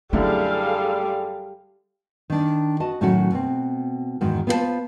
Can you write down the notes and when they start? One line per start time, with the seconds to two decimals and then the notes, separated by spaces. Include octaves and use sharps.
0.13 F#2 D3 G3 A3 E4 G#4 A4 F5
2.30 D#3 D4
2.80 F#4 D#5 A5
3.01 A2 D#3 F#3 A3 C#4 F#4
3.31 B2 C4
4.21 E2 G#2 D#3 F#4
4.47 B3 C4 F4 A4 C5 A5